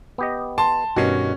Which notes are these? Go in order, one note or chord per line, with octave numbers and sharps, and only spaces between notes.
B3 G4 D#5
A5 C6
G2 B2 D#3 C#4 F#4